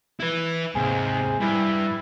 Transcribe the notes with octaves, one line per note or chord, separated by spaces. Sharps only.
E4 B4 E5
D#2 G#2 C3 G#4
G2 E4 B4